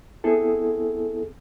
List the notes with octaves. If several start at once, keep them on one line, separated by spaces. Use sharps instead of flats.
B3 C4 E4 G#4 A4